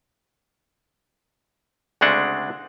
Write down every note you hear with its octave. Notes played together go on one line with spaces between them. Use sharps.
D2 C#3 G#3 C4 D4 F#5